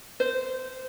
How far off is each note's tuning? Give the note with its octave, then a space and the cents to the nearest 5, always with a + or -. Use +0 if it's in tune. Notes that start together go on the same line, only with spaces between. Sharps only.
C5 -15